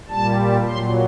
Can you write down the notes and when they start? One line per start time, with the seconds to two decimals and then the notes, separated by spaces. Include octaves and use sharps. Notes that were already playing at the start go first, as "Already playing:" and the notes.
0.08 A#2 G3 A5
0.69 A#2 F#3 C6